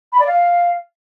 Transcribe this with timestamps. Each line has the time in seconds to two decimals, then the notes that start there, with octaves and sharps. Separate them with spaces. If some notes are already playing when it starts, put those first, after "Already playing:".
0.12 B5
0.20 D5
0.27 F5